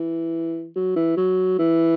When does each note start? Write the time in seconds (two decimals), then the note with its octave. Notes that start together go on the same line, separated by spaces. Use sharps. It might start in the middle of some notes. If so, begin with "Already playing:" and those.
Already playing: E3
0.76 F#3
0.96 E3
1.17 F#3
1.59 E3